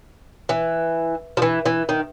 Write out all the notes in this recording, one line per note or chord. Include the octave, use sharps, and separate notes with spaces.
E3
F3
E3
E3
D#3